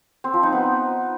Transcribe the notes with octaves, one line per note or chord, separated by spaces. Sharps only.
C4
F3
D#4
B3